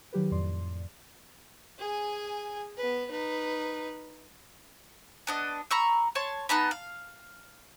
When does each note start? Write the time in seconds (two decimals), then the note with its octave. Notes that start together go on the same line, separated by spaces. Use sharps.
0.13 D#3 F#3 G4 B4
0.31 F2 A2 D5 C6
1.79 G#4 G#5
2.77 B3 B4
3.11 D#4 B4
5.27 B3 D4 D#5
5.71 A#5 B5 C#6 E6
6.15 C#5 A5 C6
6.49 B3 D#4 A5 B5
6.71 F5